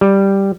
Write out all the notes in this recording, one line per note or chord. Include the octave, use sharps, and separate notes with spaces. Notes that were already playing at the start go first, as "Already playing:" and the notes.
G3